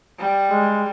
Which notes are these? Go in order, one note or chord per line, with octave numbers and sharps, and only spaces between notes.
G3
G#3